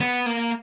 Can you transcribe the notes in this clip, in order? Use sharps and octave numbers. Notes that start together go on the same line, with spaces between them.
B3
A#3